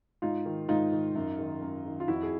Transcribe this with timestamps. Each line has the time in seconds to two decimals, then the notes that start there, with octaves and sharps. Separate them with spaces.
0.22 G#2 D#4 F4
0.46 D#3
0.69 G#2 D#4 F4
0.92 D#3
1.15 F#2
1.39 D#3
1.61 F#2
1.86 D#3
2.00 F4
2.08 F2 E4 F#4
2.23 G#4